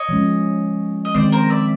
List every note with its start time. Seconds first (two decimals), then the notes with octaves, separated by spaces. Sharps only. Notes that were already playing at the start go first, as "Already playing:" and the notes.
Already playing: C#5 D#5
0.09 F3 G#3 C#4
1.05 D#5
1.14 D#3 G#3 C4 C5 D5
1.32 A#4 C5
1.50 D5 E5